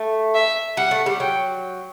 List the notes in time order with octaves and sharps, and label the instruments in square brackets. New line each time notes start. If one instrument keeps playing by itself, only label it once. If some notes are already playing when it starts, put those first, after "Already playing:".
Already playing: [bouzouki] A3
[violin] E5
[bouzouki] G3 [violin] F#5
[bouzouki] A3
G3
[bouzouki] F#3 [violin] G5